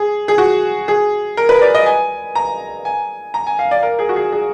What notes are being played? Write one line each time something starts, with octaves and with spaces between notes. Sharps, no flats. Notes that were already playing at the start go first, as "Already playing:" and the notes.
Already playing: G#4
G#4
F#4
G#4
A#4
B4
D5
D#5
G#5
A#5
G#5
A#5
G#5
F5
D5
A#4
G#4
F#4
G#4
G#4